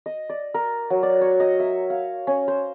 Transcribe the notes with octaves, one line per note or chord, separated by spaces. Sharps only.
D#5
D5
A#4
F#3
D5
C#5
D#5
E5
F5
C#4
C5